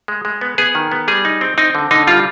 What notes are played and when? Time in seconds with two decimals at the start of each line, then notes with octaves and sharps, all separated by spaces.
0.08 G#3
0.25 G#3
0.41 B3
0.58 B3 G#4
0.75 D#3
0.92 B3
1.08 G3 G#4
1.25 D#4
1.41 C4
1.58 C4 D#4
1.75 D3
1.91 D3 D#4
2.07 G3 F4